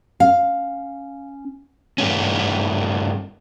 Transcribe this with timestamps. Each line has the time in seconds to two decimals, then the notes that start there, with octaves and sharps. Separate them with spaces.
0.20 C#4 F5
1.98 G2 A3 C#4